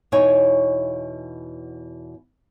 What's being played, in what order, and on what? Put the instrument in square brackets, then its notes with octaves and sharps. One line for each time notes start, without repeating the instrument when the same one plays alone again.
[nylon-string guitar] E2 B2 D#4 E4 C#5 G#5